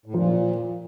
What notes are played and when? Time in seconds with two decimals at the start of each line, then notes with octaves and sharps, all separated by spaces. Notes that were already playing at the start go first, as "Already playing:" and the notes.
0.06 A2
0.14 A#2 F3